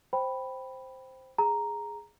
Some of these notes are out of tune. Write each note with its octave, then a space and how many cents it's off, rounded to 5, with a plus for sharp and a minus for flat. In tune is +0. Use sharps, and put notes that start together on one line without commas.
C5 +0 G5 +0 B5 +0
G#4 +0 A#5 +0